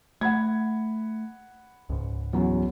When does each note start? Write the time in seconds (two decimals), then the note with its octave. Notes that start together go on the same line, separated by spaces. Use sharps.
0.21 A3 F#5 B5 G#6
1.89 C#2 G#2
2.33 E2 F#3 C#4